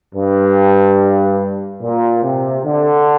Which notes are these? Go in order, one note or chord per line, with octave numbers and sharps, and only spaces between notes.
G2
A#2
C3
D3